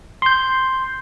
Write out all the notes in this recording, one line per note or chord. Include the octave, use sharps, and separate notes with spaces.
C6 G6